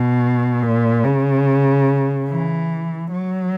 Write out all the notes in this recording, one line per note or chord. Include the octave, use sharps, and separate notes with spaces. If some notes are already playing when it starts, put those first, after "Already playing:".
Already playing: B2
A#2
C#3
E3
F#3